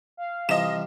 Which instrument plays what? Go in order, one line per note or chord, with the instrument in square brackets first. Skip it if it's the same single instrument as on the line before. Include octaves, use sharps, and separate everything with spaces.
[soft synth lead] F5
[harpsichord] C3 F3 [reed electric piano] E3 G3 [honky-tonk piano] D#5 E7